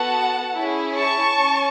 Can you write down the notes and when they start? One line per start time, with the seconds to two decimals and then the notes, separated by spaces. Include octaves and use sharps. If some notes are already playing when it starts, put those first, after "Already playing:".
Already playing: B3 F#4 A4 F#5 A5
0.58 C#4 E4 G#4
0.97 A5 C#6
1.37 C#4